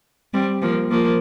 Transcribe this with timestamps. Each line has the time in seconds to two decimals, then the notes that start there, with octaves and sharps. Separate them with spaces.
0.34 G3 C4
0.62 F3 A#3
0.90 F3 A#3